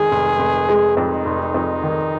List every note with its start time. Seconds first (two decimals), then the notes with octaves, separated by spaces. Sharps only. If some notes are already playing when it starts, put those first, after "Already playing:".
Already playing: F1 D#3 G#3 G#4
0.11 F1
0.39 F1
0.69 G#3
0.97 F2 D#4
1.25 F1
1.54 F2
1.83 D#3